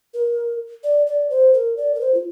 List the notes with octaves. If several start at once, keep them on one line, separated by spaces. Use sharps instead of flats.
A#4
D5
D5
C5
A#4
D5
A#4
C5
F4